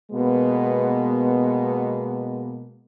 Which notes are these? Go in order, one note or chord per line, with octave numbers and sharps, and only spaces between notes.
B2 G#3 A#3 B3